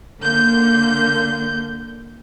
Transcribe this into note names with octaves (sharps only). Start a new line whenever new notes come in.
D3 A#3 G6